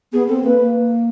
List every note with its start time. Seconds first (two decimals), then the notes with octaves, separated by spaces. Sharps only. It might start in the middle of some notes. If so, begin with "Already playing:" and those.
0.13 B3 G#4
0.28 C4 A4
0.44 A#3 B4
0.59 A#3